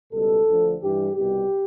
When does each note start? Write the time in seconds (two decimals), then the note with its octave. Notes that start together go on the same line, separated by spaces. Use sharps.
0.12 C#2 B2 G3 A4
0.47 D2 D3 F3
0.81 G2 E3 G3 G4
1.16 C2 B2 G3 G4